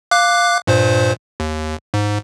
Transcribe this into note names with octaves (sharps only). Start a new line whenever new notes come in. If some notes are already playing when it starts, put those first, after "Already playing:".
F5 D6 F#6
G2 A#2 C5
D#2
G#2